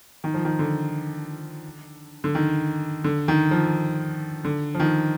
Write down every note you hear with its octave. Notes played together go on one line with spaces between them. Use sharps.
D#3
F3
D#3
D3
D3
D#3
D3
D#3
F3
D3
F3
D#3